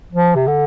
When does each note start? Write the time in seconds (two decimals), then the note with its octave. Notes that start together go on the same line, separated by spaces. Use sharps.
0.13 F3
0.35 C3
0.47 D3